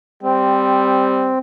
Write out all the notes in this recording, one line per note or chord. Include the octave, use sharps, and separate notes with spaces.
G3 C4